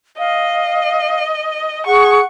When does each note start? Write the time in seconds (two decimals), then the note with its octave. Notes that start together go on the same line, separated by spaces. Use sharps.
0.19 D#5 F5
1.87 G#4 F#5 C#6